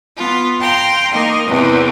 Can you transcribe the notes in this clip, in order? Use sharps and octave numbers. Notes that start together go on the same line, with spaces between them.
B3 F4
F5 G5 A#5 C6
D#3 A#3 A#4 D#5
E2 C3